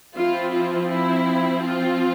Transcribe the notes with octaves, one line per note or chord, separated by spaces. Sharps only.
F3 C4 E4 F4
F4
E4
F4